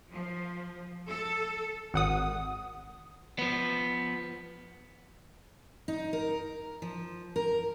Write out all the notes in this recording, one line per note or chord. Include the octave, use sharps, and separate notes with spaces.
F3
A4
G#1 F#5 D#6
F3 B3
D#4
A#4
F3
A#4